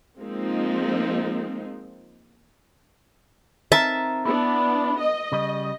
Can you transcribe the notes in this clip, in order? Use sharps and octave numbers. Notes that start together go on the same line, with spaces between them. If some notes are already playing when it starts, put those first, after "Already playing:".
F3 G#3 A#3 C4 D#4
C4 D#4 A#4 E5 A5
B3 D4 E4
D#5
C#3 G3